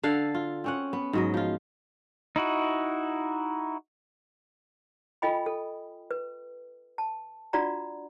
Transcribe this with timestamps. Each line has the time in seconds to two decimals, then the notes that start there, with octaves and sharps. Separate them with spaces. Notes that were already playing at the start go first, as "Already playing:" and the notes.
0.03 D3 A4 F5 F#5
0.35 F4
0.64 C4 C#4 F#5
0.93 B3
1.13 G#2 F#3 D#5
1.34 F3 F4
2.36 D#4 E4 F#4
5.22 F4 A4 D#5 G5 G#5 B5
5.46 A4
6.11 B4
6.98 A5
7.53 D4 F4 F#4 D5 F#5 A#5